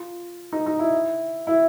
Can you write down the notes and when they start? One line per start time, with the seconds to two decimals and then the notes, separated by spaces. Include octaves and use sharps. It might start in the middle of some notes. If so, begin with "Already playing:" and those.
Already playing: F4
0.53 D#4
0.66 D#4
0.79 E4
1.47 E4